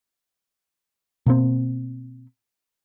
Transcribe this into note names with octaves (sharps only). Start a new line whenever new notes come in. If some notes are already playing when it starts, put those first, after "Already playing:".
B2 A#3 C4